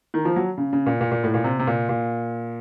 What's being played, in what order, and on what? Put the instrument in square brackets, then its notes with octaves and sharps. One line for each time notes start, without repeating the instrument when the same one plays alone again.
[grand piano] D#3
F3
F#3
C#3
C#3
A#2
A#2
A#2
A2
A#2
C3
C3
A#2
A#2